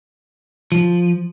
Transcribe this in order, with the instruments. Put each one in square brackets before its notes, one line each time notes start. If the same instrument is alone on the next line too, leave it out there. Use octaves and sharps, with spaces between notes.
[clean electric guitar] F3